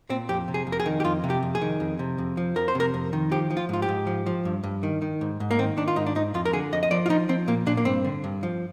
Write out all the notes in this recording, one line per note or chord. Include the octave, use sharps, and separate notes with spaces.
A#2 C4
F2 G4
C3
G#4
F2
A#4
G#4
D#3
G4
F2 F4
C3
G4
F2
G#4
D#3
F2
C3
F2
F3
F2 A#4
C5
C3 A#4
F2
D#3
F3 G4
F3
F4
G#2 F4
G4
G#2
F3
F3
G2
G2
D#3
D#3
G#2
G#2
A#3
D#3 C4
D#3 D4
F4
G#2 D#4
D4
G#2 D#4
F2 F4
A#4
D3 G#4
F2 D#5
D#5
F3 D5
F4
F3 D#4
F3 C4
A#2 A#3
A#2 D4
A#3
G2 C4
D3
G2
F3